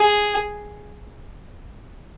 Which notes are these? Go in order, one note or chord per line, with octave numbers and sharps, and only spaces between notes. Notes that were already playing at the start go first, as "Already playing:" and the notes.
Already playing: G#4